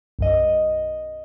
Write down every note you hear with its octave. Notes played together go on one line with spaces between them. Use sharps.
B1 F#2 D#5